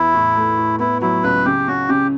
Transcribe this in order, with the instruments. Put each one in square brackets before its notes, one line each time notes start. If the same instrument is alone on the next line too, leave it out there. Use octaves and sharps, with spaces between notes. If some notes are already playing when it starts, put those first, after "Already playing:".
Already playing: [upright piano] E2 [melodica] E4
[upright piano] A2
A3
A2
[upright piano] B3 [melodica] E4
[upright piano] F#3 [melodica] E4
[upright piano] C#2 [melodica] B4
[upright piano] C#3 [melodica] G4
[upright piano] C#4 [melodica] F#4
[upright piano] C#3 [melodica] G4